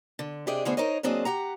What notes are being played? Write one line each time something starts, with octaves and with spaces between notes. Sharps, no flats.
D3
C3 D4 G4 G#4 D5 D#5
D3 A3 B3 F4 G#4 C5
D#4 A#4 C5 C#5 D#5
F#3 A#3 C4 D4 G#4 D#5
G4 F#5 A#5